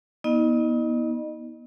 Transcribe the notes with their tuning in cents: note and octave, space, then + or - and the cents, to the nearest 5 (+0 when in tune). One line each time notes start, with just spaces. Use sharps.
B3 -30 D#4 +40 D#5 -30